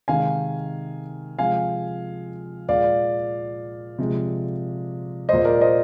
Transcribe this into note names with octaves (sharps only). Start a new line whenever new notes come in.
C3 D#3 G#3 F5 G#5
C3 F3 G#3 F5 G#5
A#2 G#3 D5 F5
C3 F3 G#3
A#2 G#3 C5 D#5
A#4 D5
C5 D#5